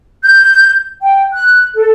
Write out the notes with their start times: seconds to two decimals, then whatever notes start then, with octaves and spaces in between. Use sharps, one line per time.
0.24 G6
1.01 G5
1.35 F#6
1.75 A4